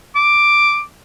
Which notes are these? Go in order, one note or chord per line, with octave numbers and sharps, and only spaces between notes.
D6